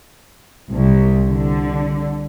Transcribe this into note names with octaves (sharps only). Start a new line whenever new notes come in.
C2
D3